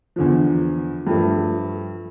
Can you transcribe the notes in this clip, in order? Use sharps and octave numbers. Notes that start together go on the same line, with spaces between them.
E2 D3 F3
G2 F3 A3